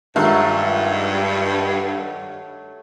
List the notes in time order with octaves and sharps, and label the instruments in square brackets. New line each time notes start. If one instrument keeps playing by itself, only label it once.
[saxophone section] G2 [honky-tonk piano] D#3 G#3 F4 [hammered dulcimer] F#3 A3